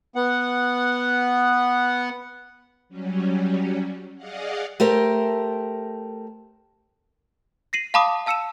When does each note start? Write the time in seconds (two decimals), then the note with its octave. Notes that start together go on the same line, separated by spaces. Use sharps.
0.16 B3 F#5
2.89 F#3 G3 C#4
4.16 G#4 D5 D#5 F5 F#5
4.80 A3 G4 A#4 C5
7.73 A#6 C7 D#7 F#7
7.94 F5 A5 B5 D6 D#6
8.26 F5 A5 E6 C#7 D#7 E7